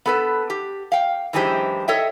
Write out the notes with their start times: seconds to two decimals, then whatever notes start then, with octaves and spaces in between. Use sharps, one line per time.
0.06 B3 A4 B4
0.50 G4
0.92 F5 G5
1.33 F#2 E3 G#3 D4 G4 C5
1.88 A4 C#5 D#5 E5 G5